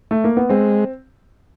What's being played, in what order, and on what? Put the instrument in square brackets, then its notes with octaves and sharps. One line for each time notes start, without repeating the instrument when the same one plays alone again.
[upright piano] A3
A#3
B3
[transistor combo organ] G#3 [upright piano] C4